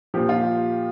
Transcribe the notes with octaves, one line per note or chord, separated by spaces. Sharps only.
A#2 F3 G4
F4